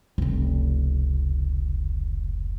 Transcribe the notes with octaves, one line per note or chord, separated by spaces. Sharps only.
F1 C#2